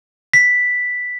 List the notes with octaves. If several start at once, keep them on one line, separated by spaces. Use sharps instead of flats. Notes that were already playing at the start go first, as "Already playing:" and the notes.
B6